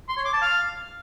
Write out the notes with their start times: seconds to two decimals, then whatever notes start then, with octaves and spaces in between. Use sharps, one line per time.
0.09 C6
0.17 C#5
0.25 D6
0.34 A5
0.42 F5